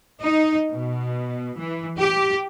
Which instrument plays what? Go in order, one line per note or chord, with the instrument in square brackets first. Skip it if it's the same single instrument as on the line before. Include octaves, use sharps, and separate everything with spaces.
[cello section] D#4
B2
E3
G4